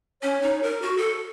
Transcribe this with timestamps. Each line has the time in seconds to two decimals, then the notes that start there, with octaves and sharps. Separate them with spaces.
0.22 C#4 C#5
0.42 D#4
0.63 A#4
0.82 F#4
0.97 A4